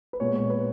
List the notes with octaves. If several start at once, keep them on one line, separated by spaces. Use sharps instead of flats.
B4
A#2 G#3 B3 C#5
C#5
B4